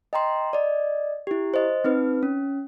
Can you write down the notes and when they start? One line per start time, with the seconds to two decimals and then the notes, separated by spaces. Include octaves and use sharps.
0.13 D#5 G5 A#5 C6
0.53 D5 D#5
1.27 E4 G4
1.54 C5 D#5
1.84 C4 D#4 B4
2.23 C#4